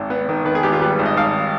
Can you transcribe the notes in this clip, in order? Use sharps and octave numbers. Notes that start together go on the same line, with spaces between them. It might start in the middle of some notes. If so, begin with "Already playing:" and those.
Already playing: G#1
B3
D#3
D#3 B4
G#4
G#1 G4
F4
G3 B4
G#1
D#5
G#1 F5